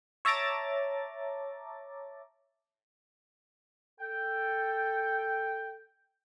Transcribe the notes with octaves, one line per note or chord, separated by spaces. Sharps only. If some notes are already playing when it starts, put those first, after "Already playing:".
C#5 E5 A5 A#5 D6 A6
A4 G5